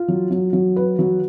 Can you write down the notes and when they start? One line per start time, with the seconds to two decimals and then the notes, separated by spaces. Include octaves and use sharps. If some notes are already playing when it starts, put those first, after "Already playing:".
Already playing: F4
0.08 F#3
0.31 F#3
0.53 F#3
0.76 B4
0.99 F#3